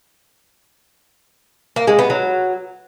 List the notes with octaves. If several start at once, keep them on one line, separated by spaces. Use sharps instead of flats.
A#3
G#3
B3
F#3